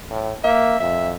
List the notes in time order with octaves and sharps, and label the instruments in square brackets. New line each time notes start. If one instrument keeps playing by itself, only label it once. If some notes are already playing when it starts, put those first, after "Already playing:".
[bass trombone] A2
[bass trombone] A#3 [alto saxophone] E5
[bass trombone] F2 [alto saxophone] E5